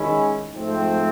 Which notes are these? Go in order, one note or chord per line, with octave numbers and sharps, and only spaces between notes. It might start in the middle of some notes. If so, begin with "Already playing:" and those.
Already playing: D#3 G#3 C#4 E4
G#2 F3 A3 C4